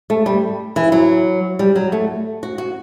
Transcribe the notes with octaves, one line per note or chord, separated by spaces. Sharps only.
A3
G3
E3
F#3
G3
F#3
A3
F#4
F#4